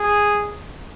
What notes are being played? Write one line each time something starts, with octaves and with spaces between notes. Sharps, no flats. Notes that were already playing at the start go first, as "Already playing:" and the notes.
Already playing: G#4